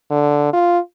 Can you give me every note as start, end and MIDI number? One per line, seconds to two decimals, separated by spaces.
0.11 0.53 50
0.53 0.79 65